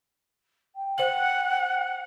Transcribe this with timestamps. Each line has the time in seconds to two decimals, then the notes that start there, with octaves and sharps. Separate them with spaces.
0.76 G5
0.98 C5 F#5 F#7